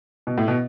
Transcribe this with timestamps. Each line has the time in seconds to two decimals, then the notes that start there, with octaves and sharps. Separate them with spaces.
0.27 B2
0.38 A2
0.48 B2